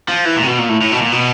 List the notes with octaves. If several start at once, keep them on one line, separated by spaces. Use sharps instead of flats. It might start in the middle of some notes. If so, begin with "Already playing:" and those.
F3
E3
A#2
C3
B2
A#2
A2
A2
B2
A#2
B2